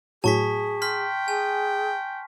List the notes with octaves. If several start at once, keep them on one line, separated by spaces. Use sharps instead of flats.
A2 F#3 G#4 A5 C#6 B6
G5 C6 F6 B6
G#4 G#5